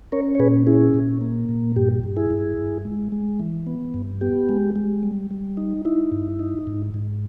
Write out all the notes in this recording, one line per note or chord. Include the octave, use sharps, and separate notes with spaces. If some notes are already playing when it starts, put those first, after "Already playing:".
C#4 A#4 C#5
C#5
A#2 G#4 B4
C#4 E4 G#4
A#2
A#3
A#2
G2 G4
G2
E4 G#4
G2
G2
G#3
G#3
E3
B3
G2
B3 G4
G#3
G#3
G3
G3
D#4
D#4 E4
G2
D#4
G#2
G#2